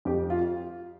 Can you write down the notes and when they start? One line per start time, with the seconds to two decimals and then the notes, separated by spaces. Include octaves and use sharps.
0.05 F2 G4
0.30 F4